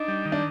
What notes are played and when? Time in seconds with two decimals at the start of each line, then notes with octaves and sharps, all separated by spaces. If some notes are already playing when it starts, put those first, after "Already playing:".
Already playing: D4 D#4
0.08 G3
0.25 D#3
0.32 D4